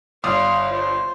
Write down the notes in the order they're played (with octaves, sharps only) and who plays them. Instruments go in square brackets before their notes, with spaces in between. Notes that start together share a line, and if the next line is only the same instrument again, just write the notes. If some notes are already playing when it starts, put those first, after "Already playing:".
[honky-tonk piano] G1 D5 D#6 [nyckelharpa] F5 C6
[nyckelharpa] F4 C5